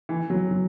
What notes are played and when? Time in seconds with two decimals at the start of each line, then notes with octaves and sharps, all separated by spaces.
0.09 E3
0.30 F#3
0.51 F#3